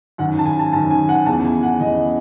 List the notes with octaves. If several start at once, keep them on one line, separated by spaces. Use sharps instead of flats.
F#2 D#3 F#5
A5
G#5
A5
F#2 D#3 A5
G#5
F#5
E2 C#3 E3 A5
G#5
F#5
E2 C#3 E3 D#5